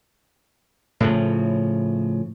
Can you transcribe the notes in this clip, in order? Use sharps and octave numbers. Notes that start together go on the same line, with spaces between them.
A2 C#3 F3